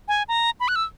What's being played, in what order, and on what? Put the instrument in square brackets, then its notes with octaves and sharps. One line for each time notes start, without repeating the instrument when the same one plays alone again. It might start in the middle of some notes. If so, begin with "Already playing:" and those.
[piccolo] G#5
A#5
B5
F#6
E6